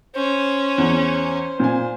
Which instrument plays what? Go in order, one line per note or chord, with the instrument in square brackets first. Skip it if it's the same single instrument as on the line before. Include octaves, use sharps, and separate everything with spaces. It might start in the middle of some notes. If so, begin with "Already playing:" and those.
[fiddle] C#4 [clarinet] C5
[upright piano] E2
[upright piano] A#2 G#5 [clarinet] C5